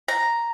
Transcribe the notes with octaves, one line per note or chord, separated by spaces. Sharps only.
A#5